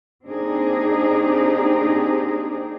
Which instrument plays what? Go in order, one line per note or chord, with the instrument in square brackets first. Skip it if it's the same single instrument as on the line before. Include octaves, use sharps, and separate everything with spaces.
[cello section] A#3 C4 D4 D#4 G4 G#4